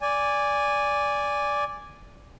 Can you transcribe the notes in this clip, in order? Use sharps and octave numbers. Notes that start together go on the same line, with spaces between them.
D5 G#5